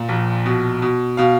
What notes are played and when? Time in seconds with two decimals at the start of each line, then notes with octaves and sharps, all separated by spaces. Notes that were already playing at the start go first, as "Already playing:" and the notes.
Already playing: A#2
0.09 A#1
0.46 B2
0.82 B2
1.17 B2 F5